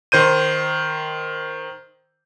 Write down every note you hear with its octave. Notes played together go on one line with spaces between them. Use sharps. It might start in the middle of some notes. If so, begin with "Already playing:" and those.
D#3 C5 G6 D#7